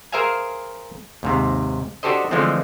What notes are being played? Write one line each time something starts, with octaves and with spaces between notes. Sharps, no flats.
G#4 A#4 C5 E5 F5 G#5
D#2 G#2 C3
D4 F#4 G4 A4 C5 D#5
D3 E3 F3 G#3 A3 C4